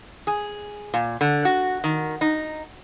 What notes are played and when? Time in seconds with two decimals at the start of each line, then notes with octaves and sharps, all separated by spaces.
0.27 G#4
0.94 A#2
1.21 D3
1.45 F#4
1.84 D#3
2.21 D#4